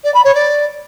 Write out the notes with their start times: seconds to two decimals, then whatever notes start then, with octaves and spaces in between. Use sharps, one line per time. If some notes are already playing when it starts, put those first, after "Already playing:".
0.04 D5
0.14 B5
0.24 C#5
0.35 D5